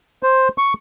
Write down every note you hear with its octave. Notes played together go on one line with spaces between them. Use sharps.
C5
C#6